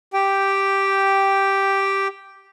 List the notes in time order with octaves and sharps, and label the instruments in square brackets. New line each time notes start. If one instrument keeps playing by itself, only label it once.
[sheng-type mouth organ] G4 G5